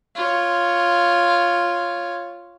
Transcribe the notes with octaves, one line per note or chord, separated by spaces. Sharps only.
F4 C#5